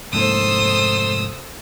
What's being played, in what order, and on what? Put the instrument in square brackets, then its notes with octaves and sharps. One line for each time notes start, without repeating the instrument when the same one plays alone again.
[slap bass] F1 G#2 A#3 [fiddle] A4 C5 [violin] D#6 E6